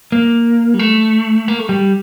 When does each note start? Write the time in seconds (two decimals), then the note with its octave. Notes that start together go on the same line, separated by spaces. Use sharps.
0.12 A#3
0.74 G3
0.79 A3
1.48 A#3
1.59 A3
1.69 G3